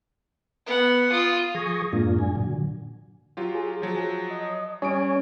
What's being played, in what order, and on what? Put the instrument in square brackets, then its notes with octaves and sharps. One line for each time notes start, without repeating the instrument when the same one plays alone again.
[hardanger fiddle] B3 F#5
F4 D#6
[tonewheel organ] F3 G#4 C#6 D#6 G#6 A#6
F#2 A2 G#3 A#3 D4 F4
G2 D4 G#5
A#2 D3 F#3
[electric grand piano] F#3 F4 G4
[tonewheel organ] G#4
[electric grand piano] F3 F#3
[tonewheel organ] D#5
[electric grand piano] G3 D#6 D7 [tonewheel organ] C#4 C#5 G#5